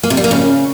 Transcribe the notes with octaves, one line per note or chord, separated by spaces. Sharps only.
A#3
C3
G3
A#3
C#3